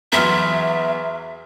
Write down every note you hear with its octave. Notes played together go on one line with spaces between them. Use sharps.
E2 F#3 E5 A#5 C6 F6